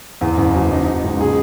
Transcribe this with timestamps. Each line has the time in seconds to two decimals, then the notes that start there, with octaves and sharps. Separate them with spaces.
0.21 E2
0.37 F#1
0.54 F#3
0.71 D#4
0.87 D#4
1.03 C#2
1.20 G#4